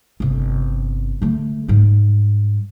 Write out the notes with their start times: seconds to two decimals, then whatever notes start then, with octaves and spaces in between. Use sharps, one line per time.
0.20 G1 C3
1.22 D3 A3
1.68 G#2 G3